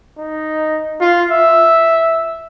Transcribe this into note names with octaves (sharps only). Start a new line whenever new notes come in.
D#4
F4
E5